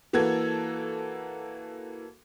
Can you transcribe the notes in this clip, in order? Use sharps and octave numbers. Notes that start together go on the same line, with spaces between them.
E3 A#3 F#4 A4 G#6